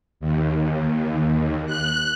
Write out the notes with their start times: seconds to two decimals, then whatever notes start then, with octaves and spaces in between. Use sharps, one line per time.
0.20 D#2
1.66 F#6